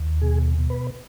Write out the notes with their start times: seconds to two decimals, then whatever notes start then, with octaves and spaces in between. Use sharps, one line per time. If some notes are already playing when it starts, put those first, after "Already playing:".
Already playing: D#2
0.21 B2 G#4
0.58 B2
0.70 B4